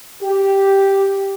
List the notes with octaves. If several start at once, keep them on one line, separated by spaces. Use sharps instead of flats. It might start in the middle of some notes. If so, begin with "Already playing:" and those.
G4